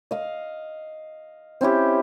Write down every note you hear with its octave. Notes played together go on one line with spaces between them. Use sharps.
D#5 F5
C4 C#4 E4 G4